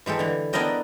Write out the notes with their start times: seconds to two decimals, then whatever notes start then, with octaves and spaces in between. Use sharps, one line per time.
0.06 E3 G#3 G4 A4
0.19 D3 E3
0.53 B3 D4 E4 A#4 D#5 G5